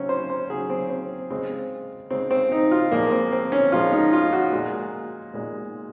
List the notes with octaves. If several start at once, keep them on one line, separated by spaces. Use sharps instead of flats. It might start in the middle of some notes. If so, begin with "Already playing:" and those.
Already playing: C#3 F#3 C4 C#4
C5
C5
C#3 F#3 G#4
C4
C4
C#3 G#3 C4
C#3 G#3 C4
C4
D#4
F4
A#2 F3 G#3 A#3
C4
C4
C#4
A#2 F3 G#3 F4
D#4
F4
F#4
A#2 G#3
A#2 G#3